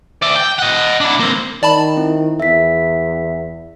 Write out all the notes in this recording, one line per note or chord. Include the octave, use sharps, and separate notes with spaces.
D5 E5
G5
D#5 F#5
D4 E4
A#3 C4
D#3 D5 A5 B5
C4 E4
E2 E5 B6